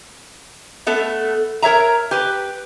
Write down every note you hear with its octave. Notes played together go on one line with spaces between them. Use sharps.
A3 B3 A4
A#4 C#5 E5 A#5
G4 B4